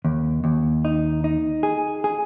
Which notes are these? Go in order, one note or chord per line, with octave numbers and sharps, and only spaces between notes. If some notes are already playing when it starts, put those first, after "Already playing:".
D#2
D#2
D#4
D#4
G#4
G#4